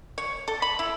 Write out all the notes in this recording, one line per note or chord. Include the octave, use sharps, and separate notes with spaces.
C#5
A4
B5
E4